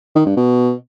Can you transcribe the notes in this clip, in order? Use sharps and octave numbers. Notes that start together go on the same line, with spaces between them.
D#3
G2
B2